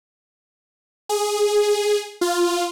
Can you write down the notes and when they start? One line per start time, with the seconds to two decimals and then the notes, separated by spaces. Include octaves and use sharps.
1.09 G#4
2.21 F4